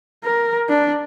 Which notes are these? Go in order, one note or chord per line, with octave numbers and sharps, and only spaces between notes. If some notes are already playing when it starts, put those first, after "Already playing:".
A#4
D4